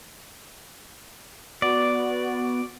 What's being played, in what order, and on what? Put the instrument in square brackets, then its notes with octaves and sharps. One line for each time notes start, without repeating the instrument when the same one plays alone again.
[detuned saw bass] B3 [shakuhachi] F#4 [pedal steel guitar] D5